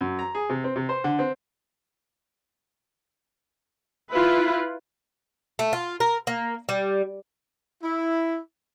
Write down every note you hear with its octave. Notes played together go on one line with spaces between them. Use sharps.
F#2
A#5
G#4
C3
C4
C3
C5
D3
C4
E4 F4 B4
A3
F4
A#4
A#3
G3
E4